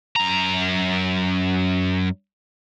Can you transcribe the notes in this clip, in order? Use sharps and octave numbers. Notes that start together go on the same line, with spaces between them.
F#2 A#5